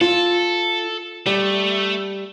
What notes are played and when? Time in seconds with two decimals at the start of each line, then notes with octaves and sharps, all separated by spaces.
0.01 F4 A4
1.26 G3 A3